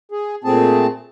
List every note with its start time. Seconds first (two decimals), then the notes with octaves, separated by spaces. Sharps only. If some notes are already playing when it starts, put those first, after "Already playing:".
0.12 G#4
0.44 A#2 A3 C4 G#4 A5